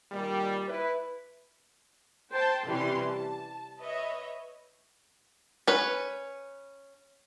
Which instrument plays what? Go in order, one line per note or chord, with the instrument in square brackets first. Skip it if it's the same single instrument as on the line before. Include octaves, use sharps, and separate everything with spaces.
[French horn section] A#2 D#3 G3
E4 B4
[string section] C5 G5 A5 C6
C3 E3 G3 C#4 C6
A5
B4 C#5 D#5 E5
[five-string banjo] C#4 B4